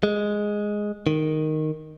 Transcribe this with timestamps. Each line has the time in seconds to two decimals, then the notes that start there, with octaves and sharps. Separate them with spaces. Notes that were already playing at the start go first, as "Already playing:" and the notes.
0.03 G#3
1.07 D#3